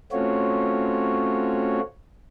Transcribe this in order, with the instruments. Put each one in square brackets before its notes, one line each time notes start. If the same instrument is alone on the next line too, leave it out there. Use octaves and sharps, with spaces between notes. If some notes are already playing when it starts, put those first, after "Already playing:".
[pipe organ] A3 C4 C#4 F4 F#4 C#5